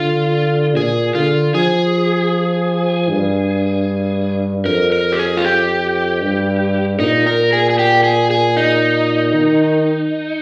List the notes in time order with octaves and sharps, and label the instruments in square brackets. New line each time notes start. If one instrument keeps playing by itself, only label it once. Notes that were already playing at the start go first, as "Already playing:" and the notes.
Already playing: [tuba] D3 [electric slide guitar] F4
[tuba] A#2 [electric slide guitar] G#4
[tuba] D3 [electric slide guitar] F4
[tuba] F3 [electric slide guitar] G#4
[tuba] G2
[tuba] F2 [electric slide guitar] A#4
[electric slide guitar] A#4
G4
G#4
F4
G4
[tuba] G2
[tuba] A#2 [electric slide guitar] D#4
[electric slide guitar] A#4
G#4
G#4
G4
G#4
G#4
D#4
[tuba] D#3